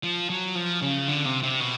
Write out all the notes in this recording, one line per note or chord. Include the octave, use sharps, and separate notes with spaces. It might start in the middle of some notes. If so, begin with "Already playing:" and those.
F3
F#3
F3
C#3
D3
C3
C3
B2